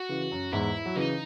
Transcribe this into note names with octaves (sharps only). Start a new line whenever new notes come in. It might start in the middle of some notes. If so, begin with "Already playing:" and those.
Already playing: F#4
C#3 E3
F#2
E2 G#2 E4
F#3
C#3 E3 D#4